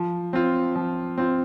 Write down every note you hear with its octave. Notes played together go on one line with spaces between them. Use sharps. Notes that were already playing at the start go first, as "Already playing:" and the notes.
Already playing: F3
C4 F4
F3
C4 F4